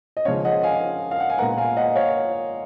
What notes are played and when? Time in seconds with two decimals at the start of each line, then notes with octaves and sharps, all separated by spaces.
0.17 D#5
0.25 C#3 F3 G#3 C#4 C#5 F5
0.45 D#5 F#5
0.63 F5 G#5
1.11 F5
1.20 F#5
1.30 G#5
1.38 A#2 G#3 B3 F#5 A#5
1.58 F5 G#5
1.77 D#5 F#5
1.96 C#5 F5